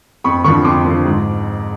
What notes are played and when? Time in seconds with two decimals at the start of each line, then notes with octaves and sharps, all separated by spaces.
0.24 F2 B5 C#6
0.44 D3 F3 B5 C#6
0.65 F2 C6 D6
0.85 D3 F3
1.05 G#2